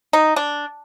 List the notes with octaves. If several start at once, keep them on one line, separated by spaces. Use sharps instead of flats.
D#4
D4